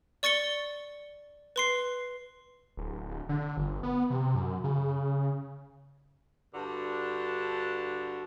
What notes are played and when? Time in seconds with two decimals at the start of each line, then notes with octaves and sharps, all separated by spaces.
0.23 D5 C#6 A6 C#7 G7
1.56 B4 C6 C7
2.77 D1
3.09 D1
3.29 D3
3.57 G1
3.83 B3
4.10 C3
4.35 F#2
4.64 C#3
6.53 G2 D3 F#4 A5